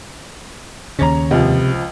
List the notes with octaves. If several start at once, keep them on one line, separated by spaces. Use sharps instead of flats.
D#2 C#3 C#4 C#5 A#5
C#2 C3 F3